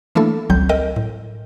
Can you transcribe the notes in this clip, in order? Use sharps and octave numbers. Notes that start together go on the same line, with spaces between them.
E3 A3 A#3 D4 E4 A4
G#1 C#2 F#3 G3 C4 G6
A4 A#4 D#5 G5
A2